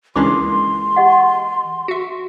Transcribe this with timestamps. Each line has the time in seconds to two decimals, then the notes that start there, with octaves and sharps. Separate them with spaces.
0.16 C#2 E3 G#3 A#3 C#4 D4 C6 D6
0.96 G4 D#5 F#5
1.88 F#4 E5